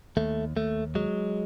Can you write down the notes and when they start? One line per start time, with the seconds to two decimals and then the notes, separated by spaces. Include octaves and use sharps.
0.17 D#2 A3
0.56 D#2 A3
0.95 F#3 G#3